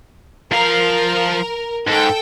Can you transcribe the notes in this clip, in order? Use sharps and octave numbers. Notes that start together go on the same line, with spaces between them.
F3 A#4 F5
G#2 A4 G5